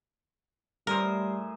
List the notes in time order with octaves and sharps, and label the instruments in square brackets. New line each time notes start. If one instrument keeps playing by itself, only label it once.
[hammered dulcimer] A2 G#4 C5 [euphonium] G3 [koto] A#4